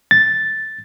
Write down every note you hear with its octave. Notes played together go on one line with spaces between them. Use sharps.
A6